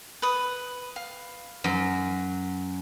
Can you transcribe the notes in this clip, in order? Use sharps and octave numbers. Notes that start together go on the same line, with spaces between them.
B4 D#6
F5
F#2